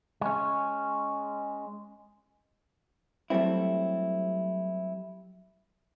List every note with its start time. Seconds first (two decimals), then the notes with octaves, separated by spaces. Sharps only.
0.21 G#3 C#4
3.30 F#3 G3 A3 C4 E4